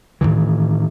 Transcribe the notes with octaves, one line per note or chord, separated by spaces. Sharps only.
A2 C3 D#3 E3